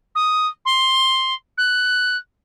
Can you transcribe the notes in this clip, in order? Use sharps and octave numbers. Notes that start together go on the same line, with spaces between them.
D#6
C6
F#6